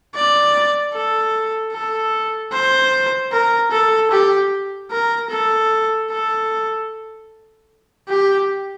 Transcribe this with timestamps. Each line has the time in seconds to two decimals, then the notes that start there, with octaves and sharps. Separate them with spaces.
0.14 D5
0.93 A4
1.73 A4
2.52 C5
3.32 A#4
3.71 A4
4.11 G4
4.91 A#4
5.30 A4
6.10 A4
8.09 G4